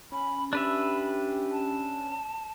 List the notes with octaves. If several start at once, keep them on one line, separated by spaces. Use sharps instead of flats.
C#4 B5
D4 G4 B4 E5 B5
A5